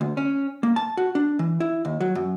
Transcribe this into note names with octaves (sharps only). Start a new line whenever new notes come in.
D2
C#4
A#3
A5
F#4
D4
E3
E4
D#2
F#3
F#2